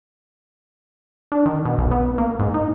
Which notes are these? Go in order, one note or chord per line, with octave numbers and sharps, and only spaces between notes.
D4
D#3
B2
B1
B3
A#3
G#2
D#4